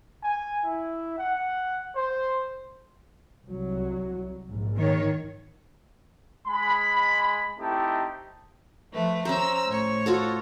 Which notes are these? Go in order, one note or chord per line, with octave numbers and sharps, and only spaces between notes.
G#5
E4
F#5
C5
C2 F#3
A#1 G#2
D#3 C#5
G#3 B5
A3 C4 D#4 E4 G4 A5
F3 A3 B4
C#4 C5 A#5 E6
A2 C#5
F4 F#4 A4